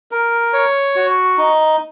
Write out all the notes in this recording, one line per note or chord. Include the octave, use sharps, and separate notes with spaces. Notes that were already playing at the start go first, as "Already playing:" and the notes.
A#4
C#5
F#4
D#4